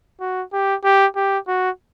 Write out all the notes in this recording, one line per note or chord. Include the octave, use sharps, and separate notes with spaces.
F#4
G4
G4
G4
F#4